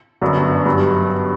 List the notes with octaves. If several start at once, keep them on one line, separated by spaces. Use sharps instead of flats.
G1 F#2 D3 F#3 B3
G2 F#3 B3